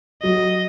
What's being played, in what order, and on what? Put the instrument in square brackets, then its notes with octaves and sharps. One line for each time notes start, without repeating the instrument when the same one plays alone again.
[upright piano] F#3 [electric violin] D#5